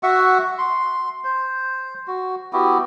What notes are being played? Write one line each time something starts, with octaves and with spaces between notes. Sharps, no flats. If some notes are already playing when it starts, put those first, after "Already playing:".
F#4 E5 F#5 C#6
C6
C5
F#4
B3 E4 F#4 G4